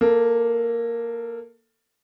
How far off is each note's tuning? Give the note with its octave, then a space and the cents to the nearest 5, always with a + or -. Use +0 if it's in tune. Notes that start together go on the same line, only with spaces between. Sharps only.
A#3 +0 A4 +20